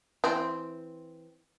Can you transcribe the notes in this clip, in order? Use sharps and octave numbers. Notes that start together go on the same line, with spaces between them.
E3 C4